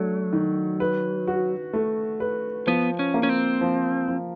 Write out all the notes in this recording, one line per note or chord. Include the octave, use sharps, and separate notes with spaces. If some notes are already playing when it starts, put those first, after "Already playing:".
Already playing: F#3 A3 D4
D#3
B4
F#4
A3
B4
F3 B3
C#4
A#3
C#4
C4
F3
F3